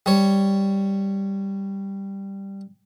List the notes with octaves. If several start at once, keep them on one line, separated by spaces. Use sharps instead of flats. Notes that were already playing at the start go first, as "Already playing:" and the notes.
G3 C#5